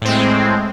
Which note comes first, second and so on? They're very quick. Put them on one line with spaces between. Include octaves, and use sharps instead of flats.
A2 C4 G#3